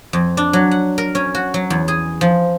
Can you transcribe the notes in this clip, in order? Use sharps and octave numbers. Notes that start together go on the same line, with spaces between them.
F2
D4
F#3
F#5
A#4
C#4
F#4
F#3
E2
G#4
F3